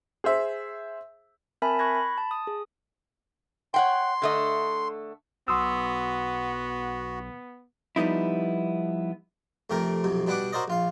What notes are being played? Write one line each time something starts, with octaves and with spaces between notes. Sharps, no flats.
G#4 C5 E5
C4 A#4 E5 G#5 A5 B5
B5 C#6 F#6 G#6 A#6
B5
A5
D#6
G#4
C#5 F#5 G5 C6
D3 A3 D#5
B1 B3 F#4 C6 D#6 E6
F3 G3 B3 D#4 E4
F2 C3 A3 G4 A#4
B1 F2 C3
B2 G3 D4 B4 F#5 D6
F#4 A#4 C5 D5 D#5
A#1 F4 F5